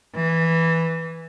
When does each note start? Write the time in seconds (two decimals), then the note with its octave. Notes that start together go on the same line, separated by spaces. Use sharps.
0.15 E3